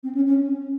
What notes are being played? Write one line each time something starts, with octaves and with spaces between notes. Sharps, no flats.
C4
C#4
C#4